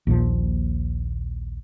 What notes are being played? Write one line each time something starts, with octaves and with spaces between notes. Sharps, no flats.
A#1 D#2 A#2 F3